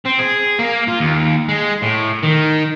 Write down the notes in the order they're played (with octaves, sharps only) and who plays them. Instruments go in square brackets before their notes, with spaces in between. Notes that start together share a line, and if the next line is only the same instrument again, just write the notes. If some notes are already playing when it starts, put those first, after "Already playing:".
[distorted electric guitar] C4
G#4
A#3
F4
D#2
G#3
A2
D#3